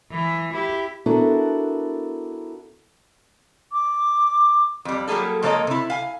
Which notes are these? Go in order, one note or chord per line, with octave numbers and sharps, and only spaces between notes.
E3
E4 G4
B3 D4 E4 F#4 A4 A#4
D6
F2 G3
F#3 G3 A#3 G#4 A4
G#2 F3 A#3 A4 C#5 D#5
C3 E4
F5 G#5